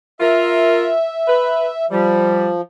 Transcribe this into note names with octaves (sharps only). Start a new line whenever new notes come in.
F4 A#4 E5
B4
F3 G3